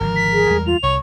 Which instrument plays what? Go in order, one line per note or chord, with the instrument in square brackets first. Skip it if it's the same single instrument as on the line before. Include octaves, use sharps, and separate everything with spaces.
[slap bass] G#1 D3 F3 [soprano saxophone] A#4
[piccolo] B6
[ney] G#4
[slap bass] E2 G3 G#3
[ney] F4 [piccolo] F7
[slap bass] C2 [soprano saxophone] C#5 [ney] C#6